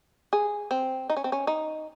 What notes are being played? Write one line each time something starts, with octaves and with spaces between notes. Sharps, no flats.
G#4
C4
D#4
C#4
C4
C#4
D#4